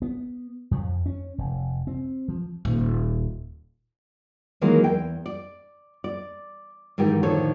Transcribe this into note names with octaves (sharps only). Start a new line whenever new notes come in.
B3
F2
C#4
F1
C4
F3
D#1
D#3 E3 F#3 G#3 A#3
E2 G5
D5
D5
G#2 D#3 E3 G4
A2 D3 D#3 F3 A4 C#5